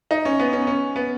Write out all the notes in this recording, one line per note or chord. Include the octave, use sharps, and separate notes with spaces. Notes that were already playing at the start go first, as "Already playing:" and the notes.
D#4
C#4
B3
C#4
C#4
B3